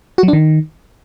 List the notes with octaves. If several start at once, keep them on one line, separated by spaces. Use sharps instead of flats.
F#4
F#3
D4
D#3